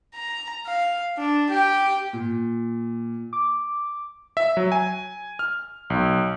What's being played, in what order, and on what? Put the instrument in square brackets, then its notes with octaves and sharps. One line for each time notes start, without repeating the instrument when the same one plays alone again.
[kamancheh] A#5
F5
D4
G4 G5
[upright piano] A#2
[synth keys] D6
[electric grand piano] E5
F#3
G#5
F6
B1